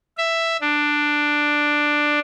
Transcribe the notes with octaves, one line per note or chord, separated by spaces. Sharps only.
E5
D4